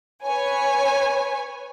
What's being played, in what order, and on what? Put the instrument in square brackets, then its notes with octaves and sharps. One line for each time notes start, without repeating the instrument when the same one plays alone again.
[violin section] B4 C#5 G#5